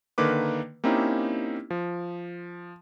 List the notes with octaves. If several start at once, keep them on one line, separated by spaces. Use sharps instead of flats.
D3 D#3 A#3 B4 D6
A#3 C4 C#4 D#4 E4 G4
F3